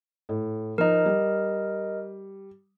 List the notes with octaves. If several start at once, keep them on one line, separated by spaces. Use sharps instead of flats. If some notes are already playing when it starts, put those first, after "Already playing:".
A2
F3 D#4 A#4 D#5
G3